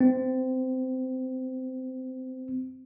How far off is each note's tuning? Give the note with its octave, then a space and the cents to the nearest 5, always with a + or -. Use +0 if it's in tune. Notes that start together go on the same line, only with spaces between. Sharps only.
C4 -20